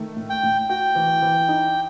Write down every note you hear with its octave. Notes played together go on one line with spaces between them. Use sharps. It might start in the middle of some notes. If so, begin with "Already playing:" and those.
Already playing: D#3 A3
A2
G5
A2
F#4 G5
E3
E3
D#4